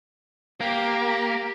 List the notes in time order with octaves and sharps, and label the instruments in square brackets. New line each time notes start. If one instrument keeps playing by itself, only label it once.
[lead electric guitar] A#3 [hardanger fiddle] G4